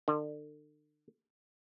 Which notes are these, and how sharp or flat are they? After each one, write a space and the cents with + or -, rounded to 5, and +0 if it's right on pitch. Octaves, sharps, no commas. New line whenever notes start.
D3 +40